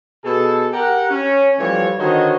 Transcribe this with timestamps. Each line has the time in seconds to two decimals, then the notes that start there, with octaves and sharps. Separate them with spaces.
0.25 B2 G#4 A4
0.73 G4 A#4 F#5
1.11 C#4
1.59 E3 F3 G3 A3 C#5
1.99 D3 D#3 F#4 C5 C#5 D#5